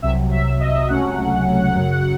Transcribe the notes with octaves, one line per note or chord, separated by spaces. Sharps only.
C2 C3 F#3 E5
E5
D#5
C#2 C3 F#3 A3 C#4 F#5
F#2 C#3 F#3